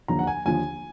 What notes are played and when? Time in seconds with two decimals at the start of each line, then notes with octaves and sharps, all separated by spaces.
0.08 D#2 D3 F3 A#5
0.19 F#5
0.27 G#5
0.46 D#2 D3 F3 G#5